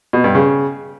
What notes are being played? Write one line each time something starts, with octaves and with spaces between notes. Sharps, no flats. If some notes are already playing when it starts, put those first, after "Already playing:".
B2
G2
C#3